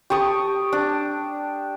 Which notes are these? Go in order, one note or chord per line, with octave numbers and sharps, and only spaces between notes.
G4 A5 C#6 D#6
D4